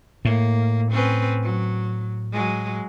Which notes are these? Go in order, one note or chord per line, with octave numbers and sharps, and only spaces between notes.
A2 A#3
C4 C#4 B4
F#3
F#3 G#3